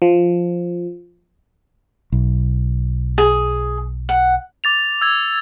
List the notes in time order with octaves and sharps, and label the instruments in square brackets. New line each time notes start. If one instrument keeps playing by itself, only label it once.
[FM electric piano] F3
[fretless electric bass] B1
[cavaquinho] G#4
F#5
[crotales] D6 A6 F7
E6 G#6